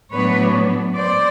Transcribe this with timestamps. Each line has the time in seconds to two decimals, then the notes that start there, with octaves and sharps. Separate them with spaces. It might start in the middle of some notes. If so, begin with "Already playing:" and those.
0.12 A2 F#3 B3 D4 B4 C#5
0.96 C5 D5